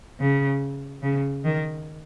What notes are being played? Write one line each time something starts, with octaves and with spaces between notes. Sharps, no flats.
C#3
C#3
D#3